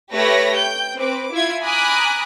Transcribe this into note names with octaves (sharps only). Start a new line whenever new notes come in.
A3 G4 B4 C#5 B5 A#6
G5 G6
C4 B4 D6
E4 F4 G#6
G#5 A#5 B5 D6 D#6 F#6